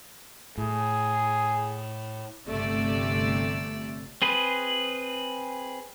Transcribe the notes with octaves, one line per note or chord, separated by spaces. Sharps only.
A2 G#4
G1 C3 A3 D5 E6
C4 G#4 B4